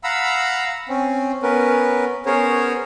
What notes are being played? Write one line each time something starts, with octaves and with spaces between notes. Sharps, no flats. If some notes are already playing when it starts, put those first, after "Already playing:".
F5 F#5 A#5 B5 E6
C4 C#4
B3 C#4 A#4 B4
B3 C#4 G#4 A#4 C5 C#5